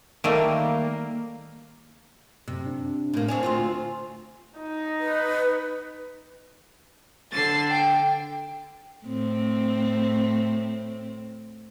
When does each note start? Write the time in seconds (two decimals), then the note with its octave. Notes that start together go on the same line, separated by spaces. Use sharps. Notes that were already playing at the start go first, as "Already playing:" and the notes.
0.24 D#3 G3 A3 A#3
2.48 F#2 C3
2.66 D4
3.14 A2 A#3
3.28 C4 D4 C#5 G#5
3.43 D2 C4 F4
4.59 D#4
5.00 B4
7.32 D3 A6 C7
7.70 G5
9.06 A2 C4